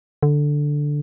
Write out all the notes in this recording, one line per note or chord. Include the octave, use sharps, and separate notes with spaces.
D3